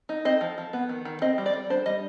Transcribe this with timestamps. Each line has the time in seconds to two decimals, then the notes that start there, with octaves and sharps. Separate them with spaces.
0.09 D#4
0.25 C4 D#5
0.41 F3
0.58 F3
0.73 B3
0.89 D#3
1.05 D#3
1.22 C4 D#5
1.38 G3
1.46 D5
1.53 G3
1.70 D4 C5
1.86 G3 D#5